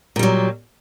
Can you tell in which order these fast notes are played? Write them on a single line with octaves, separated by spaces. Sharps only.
A#2 G3 F#3